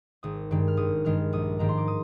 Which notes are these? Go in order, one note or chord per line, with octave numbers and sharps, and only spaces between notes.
G#1 D#6
G2 D#3 G#3
F6
G#1 D#6
G2 D#3 G#3 F6
A#1 D#6
G#2 D#3 A#3 A#5
C6
D6
D#6